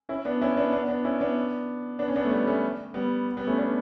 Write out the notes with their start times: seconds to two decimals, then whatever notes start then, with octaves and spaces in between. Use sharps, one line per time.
0.09 C#4 E4
0.25 B3 D4
0.42 C#4 E4
0.57 B3 D4
0.72 B3 D4
0.89 B3 D4
1.04 C#4 E4
1.20 B3 D4
1.99 B3 D4
2.08 C#4
2.16 B3 D4
2.25 A3
2.31 G3 B3
2.47 A3 C#4
2.94 G3 B3
3.37 G3 B3
3.47 A3 C#4
3.58 B3 D4